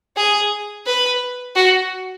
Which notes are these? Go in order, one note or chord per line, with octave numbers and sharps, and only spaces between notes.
G#4
B4
F#4